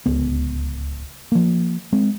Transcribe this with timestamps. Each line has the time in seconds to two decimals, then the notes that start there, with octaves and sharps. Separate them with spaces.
0.06 D1 C#2 B3
1.32 F3 A#3
1.93 G#3 C4